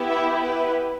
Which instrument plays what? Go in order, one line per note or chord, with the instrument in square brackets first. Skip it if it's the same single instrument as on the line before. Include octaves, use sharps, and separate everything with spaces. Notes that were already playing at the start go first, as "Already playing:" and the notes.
Already playing: [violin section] B3 E4 G4
E5
B4